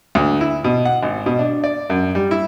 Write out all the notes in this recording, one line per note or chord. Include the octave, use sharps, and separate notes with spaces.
D2
E4
B2
F#5
G#1
B2
D4
D5
F#2
G3
E4